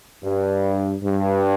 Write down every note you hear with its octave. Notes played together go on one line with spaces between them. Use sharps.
G2
G2